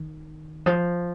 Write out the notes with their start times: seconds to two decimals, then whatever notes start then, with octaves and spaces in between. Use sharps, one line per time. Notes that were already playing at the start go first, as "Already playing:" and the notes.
Already playing: D#3
0.66 F3